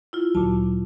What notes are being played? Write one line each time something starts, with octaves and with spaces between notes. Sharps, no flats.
E4 F4
D2 A#2 F#3 A5